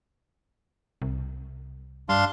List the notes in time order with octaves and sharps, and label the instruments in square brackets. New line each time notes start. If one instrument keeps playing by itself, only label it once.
[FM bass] C2
[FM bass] G2 [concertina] D4 F5 C6